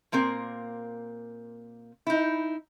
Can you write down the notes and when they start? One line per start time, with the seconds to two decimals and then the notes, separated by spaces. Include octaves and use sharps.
0.12 A#2 A#3 C4 A#4
2.07 D#4 E4